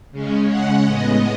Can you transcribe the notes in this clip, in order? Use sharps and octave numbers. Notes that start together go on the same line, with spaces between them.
C#3 G#3 C#4
F#5
A2 G#3 B3 D#5